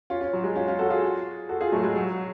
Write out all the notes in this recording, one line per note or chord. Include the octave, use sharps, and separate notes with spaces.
C#4 F4
C#4 F4
F#3
G#3
C#4 F4
C#4 F4
F#4 A4
F4 G#4
F#4 A4
F4 G#4
F#3 A3
G#3
F#3
F#3